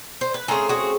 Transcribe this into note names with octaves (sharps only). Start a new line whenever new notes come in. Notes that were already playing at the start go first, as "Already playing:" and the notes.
C5
B4
C#3 E3 A3 C4 G#4 A#4
F#4 G#4